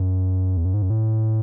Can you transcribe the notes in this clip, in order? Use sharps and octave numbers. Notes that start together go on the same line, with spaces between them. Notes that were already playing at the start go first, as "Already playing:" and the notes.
Already playing: F#2
E2
F#2
G#2
F#2
A2